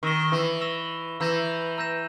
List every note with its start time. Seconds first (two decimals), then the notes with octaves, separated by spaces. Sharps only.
0.03 D#3 C#6 E6 A#6 E7 G7
0.32 E3
0.61 C#6 E6 A#6 E7 G7
1.20 E3 A#5 E6 G6 A#6 E7
1.78 A#5 E6 G6 A#6 E7